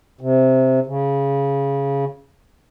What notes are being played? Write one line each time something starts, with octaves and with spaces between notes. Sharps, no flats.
C3
C#3